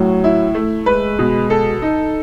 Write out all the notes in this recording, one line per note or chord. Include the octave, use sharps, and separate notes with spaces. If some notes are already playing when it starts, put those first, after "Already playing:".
Already playing: A2 F#3
E4
A3
G#3 B4
B2
A4
D#4